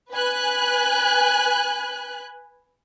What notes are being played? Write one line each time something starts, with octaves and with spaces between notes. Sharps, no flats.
B4 G#5 F#6